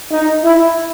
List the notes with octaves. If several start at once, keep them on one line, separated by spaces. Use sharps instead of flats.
D#4
E4